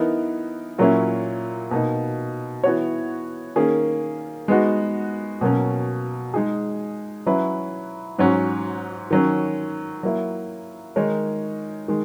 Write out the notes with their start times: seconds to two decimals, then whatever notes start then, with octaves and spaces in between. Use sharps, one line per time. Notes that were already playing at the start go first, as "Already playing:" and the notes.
Already playing: E3 B3 D#4 A#4
0.78 A#2 F#3 A#3 C#4 E4
1.71 B2 A#3 D#4
2.64 E3 B3 F#4 C#5
3.56 D#3 A#3 C#4 G#4
4.48 G#3 B3 D#4 F#4
5.41 B2 F#3 A#3 C#4
6.34 G#3 D#4 G#4
7.26 F#3 C#4 E4 B4
8.18 G#2 F#3 C#4 F#4
9.11 D#3 F#3 C#4
10.03 F#3 A#3 E4
10.96 D#3 G#3 D#4 A#4 C#5
11.88 D#3 G#3